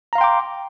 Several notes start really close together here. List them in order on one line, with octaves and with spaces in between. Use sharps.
A#5 F5 C6 G5 D6